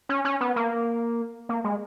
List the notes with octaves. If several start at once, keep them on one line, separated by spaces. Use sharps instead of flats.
C#4
C#4
B3
A#3
A#3
G#3